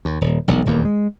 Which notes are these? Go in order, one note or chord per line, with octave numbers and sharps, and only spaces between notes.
D#2
D#1
E1 B1
D#1 E2 A#3
G#3